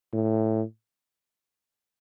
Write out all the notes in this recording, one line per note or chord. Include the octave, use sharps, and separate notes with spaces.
A2